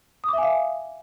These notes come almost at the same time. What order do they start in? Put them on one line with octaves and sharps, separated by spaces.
D#6 D6 E5 G#5 F5